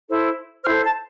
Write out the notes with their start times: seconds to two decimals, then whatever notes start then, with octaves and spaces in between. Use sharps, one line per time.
0.09 E4 A4 C5
0.64 C5 F6
0.68 E4 A4
0.83 A5